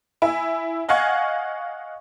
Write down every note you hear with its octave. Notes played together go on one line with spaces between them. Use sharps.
E4 E5 G#5
D#5 F5 F#5 G#5 C#6 G#6